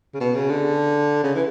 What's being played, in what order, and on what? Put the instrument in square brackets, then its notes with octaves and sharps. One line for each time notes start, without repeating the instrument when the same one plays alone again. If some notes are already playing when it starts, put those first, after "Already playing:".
[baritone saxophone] C#3
B2
C#3
D3
C#3
E3